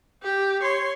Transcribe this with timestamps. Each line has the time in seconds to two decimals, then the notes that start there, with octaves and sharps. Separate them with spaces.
0.23 G4
0.62 C#5 C6